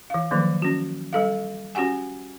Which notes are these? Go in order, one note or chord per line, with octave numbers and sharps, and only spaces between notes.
E3 F5
D#3 F3 F#3 A#3
C#4 F#4
G3 A4 F5
C#4 F#4 G4 F#5 G#5